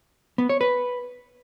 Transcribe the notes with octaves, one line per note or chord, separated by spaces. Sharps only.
B3
C#5
B4